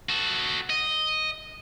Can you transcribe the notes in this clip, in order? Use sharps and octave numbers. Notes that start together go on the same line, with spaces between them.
F#4 A4
D#5